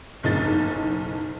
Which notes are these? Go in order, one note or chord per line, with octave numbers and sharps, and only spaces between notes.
F#1 B1 D#4 A6